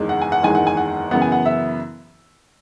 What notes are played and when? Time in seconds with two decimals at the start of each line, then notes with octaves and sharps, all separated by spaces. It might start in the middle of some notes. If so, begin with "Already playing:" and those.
Already playing: F#1 E2 D#3 G#3
0.09 F#5
0.22 G#5
0.32 F#5
0.43 F#1 E2 D#3 G#3 G#5
0.55 F#5
0.67 G#5
0.77 F#5
1.11 F#2 C#3 E3 B3 F#5
1.22 G#5
1.32 F#5
1.46 E5